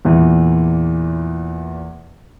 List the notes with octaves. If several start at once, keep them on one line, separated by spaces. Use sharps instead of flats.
E2 A#2 E3